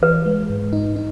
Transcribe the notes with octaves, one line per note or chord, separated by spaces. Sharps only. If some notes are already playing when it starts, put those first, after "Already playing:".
E3 B4
G#3
G#2
D#4
D#4